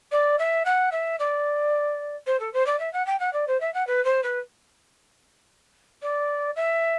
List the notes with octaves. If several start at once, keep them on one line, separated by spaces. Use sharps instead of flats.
D5
E5
F#5
E5
D5
C5
A4
C5
D5
E5
F#5
G5
F#5
D5
C5
E5
F#5
B4
C5
B4
D5
E5